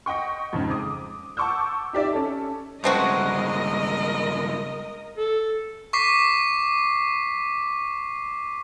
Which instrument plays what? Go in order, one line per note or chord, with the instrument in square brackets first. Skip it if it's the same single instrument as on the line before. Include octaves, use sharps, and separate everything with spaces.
[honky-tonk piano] D#5 F#5 G5 C#6
F2 G#2 C#3
D6 D#6
F#5 A5 C#6 D6 E6 G6
D#4 G4 D5 E5
C#4 A4
[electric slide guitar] G2 C#3 G#3 [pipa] A3 C4 F#4 [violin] A#4 D#5
[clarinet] A4
[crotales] C#6 D6 B6 C7